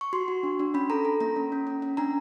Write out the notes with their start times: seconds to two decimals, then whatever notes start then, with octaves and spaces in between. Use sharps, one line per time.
0.01 C#6
0.13 F#4 C6
0.28 F#4
0.43 D4
0.59 D4
0.74 C#4 B5
0.90 A4 A#5
1.05 A4
1.20 A#3 A#5
1.36 C#4
1.52 C#4
1.67 C#4
1.82 C#4
1.97 D4 A#5